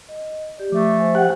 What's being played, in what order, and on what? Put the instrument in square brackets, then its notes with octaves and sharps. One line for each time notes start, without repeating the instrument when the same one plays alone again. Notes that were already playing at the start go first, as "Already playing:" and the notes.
[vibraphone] D#5
G4 D5
[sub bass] F3 [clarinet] A3 [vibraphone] D6
[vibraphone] C5 G#5
[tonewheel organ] G4 F#5